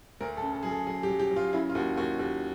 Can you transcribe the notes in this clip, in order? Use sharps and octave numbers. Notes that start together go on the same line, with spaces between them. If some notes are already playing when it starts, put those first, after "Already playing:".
D2 A#4
A4
C#3
A4
F#3 G#4
A4
F#3 G#4
G4
F#3
G4
F#3
F4
C#3 E4
F4
D#2 F#4
D#2 F#4
D#2